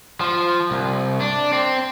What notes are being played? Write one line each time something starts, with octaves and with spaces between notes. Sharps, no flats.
F3
C2
D4
C4